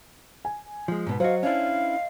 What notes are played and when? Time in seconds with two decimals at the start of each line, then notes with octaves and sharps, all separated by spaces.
0.45 G#5
0.88 F3 G#3
1.07 G#2 B2 B3
1.20 F#3 F#4 C5 D#5 F5
1.43 C#4 D4 E4 F5